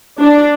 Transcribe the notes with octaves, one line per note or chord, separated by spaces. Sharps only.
D4